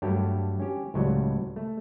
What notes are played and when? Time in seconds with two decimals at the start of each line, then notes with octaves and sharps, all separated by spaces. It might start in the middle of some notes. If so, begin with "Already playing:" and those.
0.02 G2 F#3 A3 G4
0.60 C#4 G4
0.94 C#2 A2 F#3 G3
1.56 A3